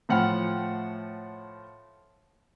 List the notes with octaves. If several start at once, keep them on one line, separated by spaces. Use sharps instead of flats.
A2 F3 F#5 G5 B5 F6